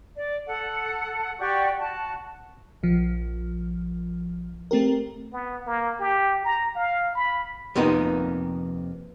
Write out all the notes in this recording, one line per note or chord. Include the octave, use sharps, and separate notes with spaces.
D5
A4 F#5
F#4 G4 D5 C#6
F#4 A5
A#1 F3
A3 C4 G4 A#4
B3
A#3
G4
A#5
F5
B5
F2 C3 A#3 B3 D#4